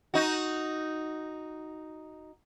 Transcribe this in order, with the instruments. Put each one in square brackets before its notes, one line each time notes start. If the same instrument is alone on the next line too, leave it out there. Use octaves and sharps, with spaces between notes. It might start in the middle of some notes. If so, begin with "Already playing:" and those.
[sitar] D#4 F#4